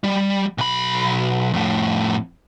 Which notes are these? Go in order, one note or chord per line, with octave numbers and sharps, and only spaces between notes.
G3
B1 B5
F2 A2